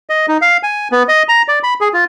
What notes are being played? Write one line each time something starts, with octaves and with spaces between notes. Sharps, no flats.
D#5
D#4
F5
G#5
B3
D#5
A#5
D5
B5
G#4
F4